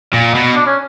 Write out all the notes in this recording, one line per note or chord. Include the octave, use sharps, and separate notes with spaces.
A#2
B2
D4
C#4